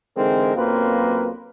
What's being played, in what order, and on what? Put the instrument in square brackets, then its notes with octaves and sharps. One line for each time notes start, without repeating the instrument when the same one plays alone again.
[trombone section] D3 E3 G#3 C4 D#4 A#4
B1 F#2 A#3 C4 F4 B4